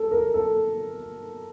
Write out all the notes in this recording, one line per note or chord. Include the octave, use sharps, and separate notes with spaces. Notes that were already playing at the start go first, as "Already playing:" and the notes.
Already playing: A4
A#4
A4